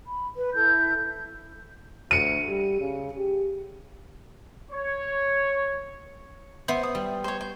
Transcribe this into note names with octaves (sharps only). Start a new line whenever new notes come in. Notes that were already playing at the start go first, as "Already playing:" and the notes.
B5
B4
E4 A4 G6
D2 C#7 D#7
G3
C#3
G4
C#5
B3 C5 E5
D#6
G3
C5 C#5
C5